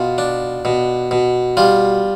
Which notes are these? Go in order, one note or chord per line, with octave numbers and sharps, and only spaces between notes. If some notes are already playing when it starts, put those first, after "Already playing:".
Already playing: B2 F4
D4
B2
B2
G3 F4